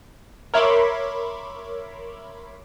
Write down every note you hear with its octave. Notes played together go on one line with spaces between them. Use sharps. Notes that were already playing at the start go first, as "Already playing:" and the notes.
A#4 C#5 E5 B5 C6 D6